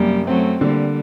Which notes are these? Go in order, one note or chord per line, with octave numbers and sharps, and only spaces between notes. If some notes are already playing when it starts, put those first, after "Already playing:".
Already playing: F#2 C3 G3 A#3
F#3 A3 C4
D3 G3 A#3